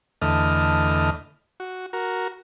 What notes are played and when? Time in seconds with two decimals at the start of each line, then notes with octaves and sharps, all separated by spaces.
0.22 E2 D3 A3 D#5 F6
1.60 F#4
1.93 F#4 A#4